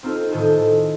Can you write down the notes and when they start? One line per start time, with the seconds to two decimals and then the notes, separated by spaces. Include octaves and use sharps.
0.03 C4 D#4 F4 A4
0.32 A2 D#3 G#4 A4 G6